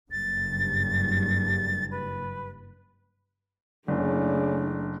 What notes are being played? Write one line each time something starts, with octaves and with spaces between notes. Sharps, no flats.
F#1 G2 A6
B4
F#1 C#3 A3 D4 D5